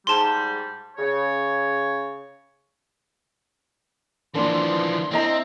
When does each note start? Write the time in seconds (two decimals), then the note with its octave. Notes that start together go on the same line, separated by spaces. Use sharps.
0.07 G#2 G3 A5 C6
0.97 C#3 C#5
4.35 E3 F3 A#3 D4 C6
5.11 C4 E4 D#5 A#5